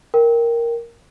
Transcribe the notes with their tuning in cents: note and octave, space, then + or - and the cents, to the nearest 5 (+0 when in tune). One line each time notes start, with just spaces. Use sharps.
A#4 +0 G5 +0